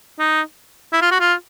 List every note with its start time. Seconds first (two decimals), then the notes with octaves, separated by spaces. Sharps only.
0.19 D#4
0.93 E4
1.02 F4
1.11 F#4
1.20 F4